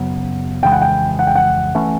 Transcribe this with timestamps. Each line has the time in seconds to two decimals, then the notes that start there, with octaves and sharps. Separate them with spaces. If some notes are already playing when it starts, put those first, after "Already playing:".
Already playing: F#2 C#3 F#3 B3
0.62 F2 C#3 E3 G#3 G5
0.72 F#5
0.82 G5
1.19 F#5
1.27 G5
1.35 F#5
1.75 E3 A3 C#4